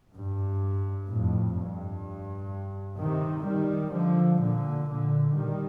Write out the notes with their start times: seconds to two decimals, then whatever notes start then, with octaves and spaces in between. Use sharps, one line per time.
0.14 G2
1.08 F2 A2
1.56 G2
2.99 C3 D#3
3.46 D#3 G3
3.94 D3 F3
4.41 A#2 D3
4.89 A#2 D3
5.36 D#3 G3